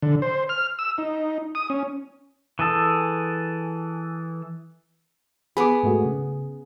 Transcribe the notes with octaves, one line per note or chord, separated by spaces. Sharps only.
D3
C5
F6
E6
D#4
D#6
C#4
E3 G#4 A4
B3 G#4 B5 D6
G#2 A3 F#4
C#3